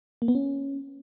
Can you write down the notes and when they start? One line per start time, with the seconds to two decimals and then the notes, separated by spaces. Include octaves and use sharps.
0.22 A#3
0.28 B3
0.35 C#4